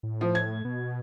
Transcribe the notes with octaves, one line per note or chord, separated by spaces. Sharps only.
A2
F3
G#6
B2